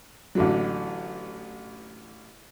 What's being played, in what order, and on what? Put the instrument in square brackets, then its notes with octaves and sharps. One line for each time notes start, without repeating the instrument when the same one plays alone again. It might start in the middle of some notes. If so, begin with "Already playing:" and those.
[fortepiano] A1 D3 F#3